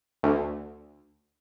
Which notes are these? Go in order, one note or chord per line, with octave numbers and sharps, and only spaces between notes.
D2